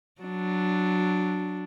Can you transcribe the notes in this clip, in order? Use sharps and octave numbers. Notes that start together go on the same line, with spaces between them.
F#3 D4